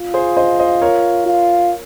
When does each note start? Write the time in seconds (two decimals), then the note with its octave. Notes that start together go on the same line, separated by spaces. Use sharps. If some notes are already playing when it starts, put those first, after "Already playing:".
Already playing: F4
0.14 G#4 C5
0.37 C5 D#5
0.59 C5 D#5
0.82 A#4 C#5
1.27 F4